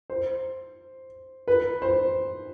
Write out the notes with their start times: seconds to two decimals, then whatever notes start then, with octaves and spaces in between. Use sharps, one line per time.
0.10 C5
1.48 B4
1.82 C5